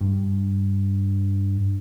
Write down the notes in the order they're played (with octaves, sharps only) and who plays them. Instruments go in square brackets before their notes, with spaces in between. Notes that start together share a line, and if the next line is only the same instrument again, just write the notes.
[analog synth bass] G2